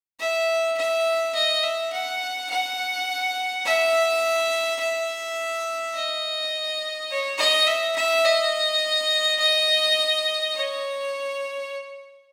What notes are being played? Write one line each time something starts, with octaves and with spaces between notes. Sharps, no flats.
E5
E5
D#5
E5
F#5
F#5
E5
E5
D#5
C#5
D#5
E5
E5
D#5
D#5
C#5